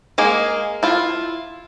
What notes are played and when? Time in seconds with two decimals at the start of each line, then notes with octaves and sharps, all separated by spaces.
0.18 G#3 A#3 G#4
0.83 E4 F4